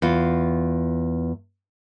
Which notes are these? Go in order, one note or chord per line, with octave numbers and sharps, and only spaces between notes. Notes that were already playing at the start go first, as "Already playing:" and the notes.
E2 F4